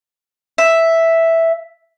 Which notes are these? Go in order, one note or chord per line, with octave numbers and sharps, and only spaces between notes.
E5